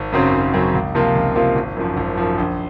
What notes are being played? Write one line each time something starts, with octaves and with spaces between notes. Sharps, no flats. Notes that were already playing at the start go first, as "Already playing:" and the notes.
Already playing: G#1
F#2 C#3 F#3 C4
G#1
F#2 C#3 F#3 C4
C#2
C3 F3 A#3 F4
C#2
C3 F3 A#3 F4
G#1
F#2 F3
G#1
F#2 F3
A#1